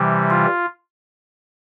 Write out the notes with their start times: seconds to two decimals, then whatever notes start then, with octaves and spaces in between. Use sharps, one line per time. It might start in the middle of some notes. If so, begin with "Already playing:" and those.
Already playing: C3 E3 G3
0.30 F4